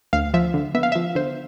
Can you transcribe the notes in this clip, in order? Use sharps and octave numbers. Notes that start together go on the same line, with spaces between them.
D2 F5
F3 E5
D3
B3 E5
F5
F3 E5
D3 C5